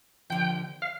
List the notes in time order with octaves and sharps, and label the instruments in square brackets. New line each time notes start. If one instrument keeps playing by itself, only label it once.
[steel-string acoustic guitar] D#2 D3 F3 [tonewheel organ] G5
[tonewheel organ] F5